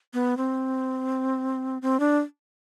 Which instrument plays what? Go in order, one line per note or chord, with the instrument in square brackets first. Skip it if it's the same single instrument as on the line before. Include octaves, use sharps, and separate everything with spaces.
[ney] B3
C4
C4
D4